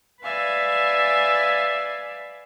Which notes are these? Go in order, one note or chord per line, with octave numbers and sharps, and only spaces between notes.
B4 D5 E5 F5 G#5